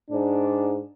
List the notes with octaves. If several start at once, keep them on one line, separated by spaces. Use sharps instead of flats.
G#2 D4